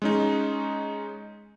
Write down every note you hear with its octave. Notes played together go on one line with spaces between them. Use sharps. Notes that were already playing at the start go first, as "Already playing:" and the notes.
G#3 C#4 D#4